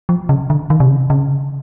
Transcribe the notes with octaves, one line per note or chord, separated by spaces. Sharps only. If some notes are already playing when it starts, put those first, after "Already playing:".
F3
C#3
D3
D#3
C3
C#3
C#3